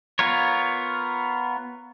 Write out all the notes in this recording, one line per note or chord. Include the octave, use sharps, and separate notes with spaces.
B3 F4 A#4 C#5